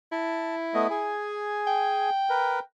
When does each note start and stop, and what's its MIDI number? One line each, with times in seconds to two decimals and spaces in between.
0.12 1.17 64
0.12 0.56 81
0.74 0.87 57
0.74 0.87 59
0.74 0.87 75
0.90 2.10 68
0.90 2.10 80
1.67 2.60 79
2.29 2.60 70
2.29 2.60 71